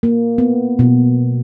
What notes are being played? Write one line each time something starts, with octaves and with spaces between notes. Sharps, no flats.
A#3
B3
B2